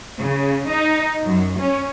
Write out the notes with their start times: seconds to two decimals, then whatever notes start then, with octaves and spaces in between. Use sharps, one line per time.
0.22 C#3
0.69 D#4
1.27 F#2
1.61 C#4